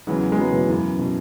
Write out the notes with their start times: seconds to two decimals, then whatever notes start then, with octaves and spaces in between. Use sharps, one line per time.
0.07 E2 C#3 E3 F#3 G#3
0.32 G#3
0.37 F#3 B3
0.53 B2 E3
0.68 F#2 C#3 E3 B3
0.99 B2